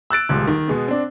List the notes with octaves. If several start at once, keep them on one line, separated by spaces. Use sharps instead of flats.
E6 F#6 A6 D7
D#1 C#2 F#6
D#3
B2 G#3 B3
C4 D4